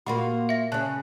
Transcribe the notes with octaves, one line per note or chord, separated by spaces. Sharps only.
A#2 A#3 F4 F#4 B5
E5 A#6
C#3 C#4 A5 F#6